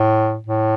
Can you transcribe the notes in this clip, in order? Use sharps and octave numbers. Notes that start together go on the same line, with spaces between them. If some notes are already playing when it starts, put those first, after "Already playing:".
Already playing: A2
A2